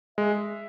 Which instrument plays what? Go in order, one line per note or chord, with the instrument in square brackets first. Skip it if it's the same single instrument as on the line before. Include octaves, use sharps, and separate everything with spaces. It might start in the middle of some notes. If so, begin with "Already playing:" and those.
[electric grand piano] G#3 [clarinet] E5